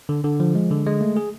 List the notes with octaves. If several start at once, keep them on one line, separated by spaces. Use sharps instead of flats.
D3
D3
F3
G#3
D3
G#3
A3
G#4